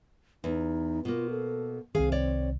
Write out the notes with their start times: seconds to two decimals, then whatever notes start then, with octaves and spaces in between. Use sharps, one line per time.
0.44 E2 D#4
1.05 B2 A#3 F4
1.30 A4
1.95 C2 D#3 C4 G#4 F5 G#5
2.12 C#5 D5